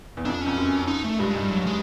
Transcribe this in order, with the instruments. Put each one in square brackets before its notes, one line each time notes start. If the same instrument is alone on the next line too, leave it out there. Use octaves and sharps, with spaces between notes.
[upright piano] E2
[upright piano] F2 [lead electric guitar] D4
[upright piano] F2 [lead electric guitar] C#4
[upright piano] F#2
[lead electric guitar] D#4
A3
[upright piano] G2 [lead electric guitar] G#3
[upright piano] G#2 [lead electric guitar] G3
[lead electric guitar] F#3
G#3